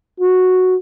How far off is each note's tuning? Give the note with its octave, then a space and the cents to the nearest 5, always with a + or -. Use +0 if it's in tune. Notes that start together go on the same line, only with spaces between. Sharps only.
F#4 -5